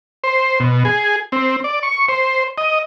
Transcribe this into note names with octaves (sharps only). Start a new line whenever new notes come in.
C5
B2
G#4
C4
D5
C#6
C5
D#5